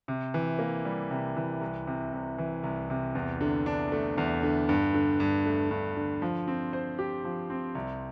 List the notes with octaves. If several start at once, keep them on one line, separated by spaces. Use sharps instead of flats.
C3
E3
A#3
G3
C3
E3
C2
C3
C2
E3
C2
C3
E2
D3
D4
A3
E2
D3
G2
D3
G2
A3
G2
D3
F3
C4
C5
G4
F3
C4
C2